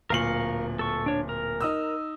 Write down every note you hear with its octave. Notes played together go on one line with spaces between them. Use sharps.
D1 A#2 A#4 F5 C#6 F#7
A4 C#6
D4 C#5
A#4
D#4 D#6 E6